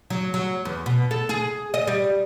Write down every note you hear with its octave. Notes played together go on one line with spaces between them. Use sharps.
F#3
F#3
E2
B2
A4
G#4
D#5
G3